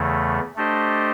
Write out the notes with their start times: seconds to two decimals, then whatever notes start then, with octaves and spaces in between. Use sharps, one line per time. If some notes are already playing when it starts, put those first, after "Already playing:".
Already playing: E2 C#3 E3 A3
0.56 A3 D4 G4 C5 D#5